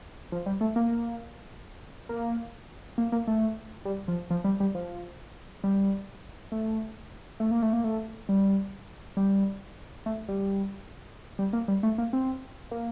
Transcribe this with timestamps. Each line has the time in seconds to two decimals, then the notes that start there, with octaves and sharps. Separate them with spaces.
0.32 F3
0.46 G3
0.61 A3
0.76 A#3
2.09 A#3
2.98 A#3
3.12 A#3
3.27 A3
3.85 G3
4.08 F3
4.30 F3
4.44 G3
4.60 G3
4.75 F3
5.64 G3
6.52 A3
7.40 A3
7.51 A#3
7.62 A3
7.73 A#3
7.84 A3
8.29 G3
9.17 G3
10.06 A3
10.28 G3
11.39 G3
11.53 A#3
11.68 G3
11.83 A3
11.98 A#3
12.13 C4
12.71 A#3